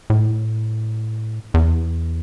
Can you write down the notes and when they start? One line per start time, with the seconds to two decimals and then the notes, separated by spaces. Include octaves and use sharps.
0.10 A2
1.54 E2